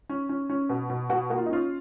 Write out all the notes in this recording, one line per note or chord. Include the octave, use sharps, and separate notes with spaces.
C#4
C#4
C#4
B2
B2
B2 F#4
A#3 F#4
F4
D#4
C#4 F4